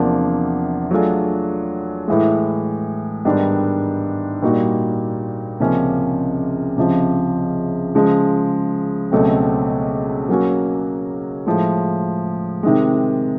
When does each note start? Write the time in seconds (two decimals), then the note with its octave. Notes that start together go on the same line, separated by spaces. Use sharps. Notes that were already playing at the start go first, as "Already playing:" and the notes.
Already playing: E2 C3 F3 A#3 D4
0.91 F#3 A3 D4 F4 G#4
2.08 A2 E3 G#3
3.25 G#2 D#3 G3 B3 D4
4.43 A#2 G3 A#3 D#4 F#4
5.60 C#2 C3 F3 A#3 C#4
6.77 C#2 C3 F3
7.95 C#3 F3 G#3
9.11 C#2 B2 F#3 A3 C4
10.29 F#3 A#3 C#4 F#4
11.46 A2 F3 G#3
12.63 C3 D#3 G#3